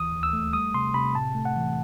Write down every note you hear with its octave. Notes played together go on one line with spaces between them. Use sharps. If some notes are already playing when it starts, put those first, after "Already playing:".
Already playing: D2 E3 D#6
D#2
E6
A3
G3 D#6
C3 C6
C3 B5
A2 A5
A3
F#5
E3